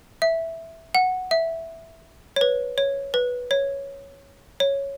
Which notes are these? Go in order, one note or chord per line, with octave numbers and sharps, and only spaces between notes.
E5
F#5
E5
C#5
B4
C#5
B4
C#5
C#5